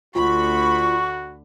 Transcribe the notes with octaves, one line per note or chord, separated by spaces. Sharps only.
D2 D3 F4 F#4 B5 C#6